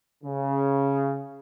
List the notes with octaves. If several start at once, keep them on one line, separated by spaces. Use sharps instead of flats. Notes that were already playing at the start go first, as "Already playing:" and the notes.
C#3